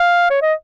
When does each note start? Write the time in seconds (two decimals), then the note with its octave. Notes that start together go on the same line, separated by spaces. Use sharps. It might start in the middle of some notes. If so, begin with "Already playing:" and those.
Already playing: F5
0.30 C#5
0.42 D#5